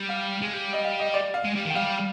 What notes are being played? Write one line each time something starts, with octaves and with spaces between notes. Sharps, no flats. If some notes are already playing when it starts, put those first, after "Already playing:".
Already playing: G3
F5
G#3
G3
D#5
F5
D#5
D5
F5
G#3
G3
D#3
G5
G3 F5